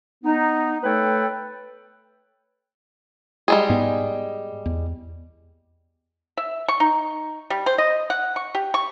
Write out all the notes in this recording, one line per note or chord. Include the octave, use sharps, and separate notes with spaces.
B3 D#4
A3 A4 B4 C#5 G5
G3 G#3 G#4
G#2 B3
E2
E5
C#6
D#4
G3
C5
D#5
F#5
C#6
G4
C#6